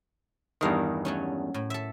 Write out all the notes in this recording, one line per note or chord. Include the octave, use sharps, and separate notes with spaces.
E2 G2 D#3 A#4 F5
F#3 A3 C#4
A2
A4 E5